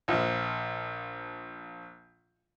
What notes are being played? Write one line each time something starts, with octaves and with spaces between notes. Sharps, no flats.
A#1 F3